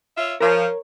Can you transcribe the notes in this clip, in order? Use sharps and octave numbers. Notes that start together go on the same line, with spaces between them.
F4 C#5 E5
F3 A#4 C#5